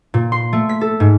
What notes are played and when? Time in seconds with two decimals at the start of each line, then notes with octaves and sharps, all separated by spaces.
0.14 A#2
0.32 C6
0.53 A3
0.69 B6
0.81 A4
1.00 G#2